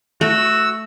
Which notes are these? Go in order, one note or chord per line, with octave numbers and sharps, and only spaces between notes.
A3 F#4 E6